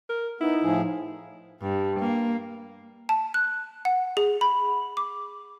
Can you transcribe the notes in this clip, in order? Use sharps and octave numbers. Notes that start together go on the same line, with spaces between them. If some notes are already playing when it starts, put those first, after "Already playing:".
A#4
B3 D#4 E4
A2 F3 G#4
G2
A#3
A5
F#6
F#5
G#4
B5
D6